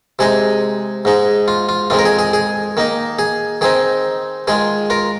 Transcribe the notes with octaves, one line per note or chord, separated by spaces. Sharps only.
C3 G#3 D#4 G#4
G#2 G#3 D#4
F4
F4
F2 D#3 G#3 F4
A#4
G#4
G#4
G#4
D#3 A#3 D#4
G#4
D#3 C4 D#4 G#4
D#3 G#3 F4 G#4
F4 A#4